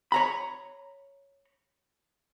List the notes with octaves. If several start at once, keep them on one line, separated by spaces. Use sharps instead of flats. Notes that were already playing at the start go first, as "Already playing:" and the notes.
C#5 A#5 B5